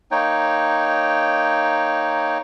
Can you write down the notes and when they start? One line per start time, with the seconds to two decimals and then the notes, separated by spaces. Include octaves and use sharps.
0.11 A#3 D#4 C#5 G5